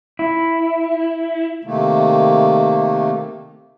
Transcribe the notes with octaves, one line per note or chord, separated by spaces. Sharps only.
E4
C3 D#3 A3 A#3